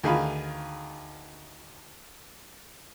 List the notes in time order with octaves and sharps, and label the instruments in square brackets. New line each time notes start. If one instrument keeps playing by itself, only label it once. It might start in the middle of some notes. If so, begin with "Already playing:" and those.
[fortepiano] D2 D#3 G#4 F5 B5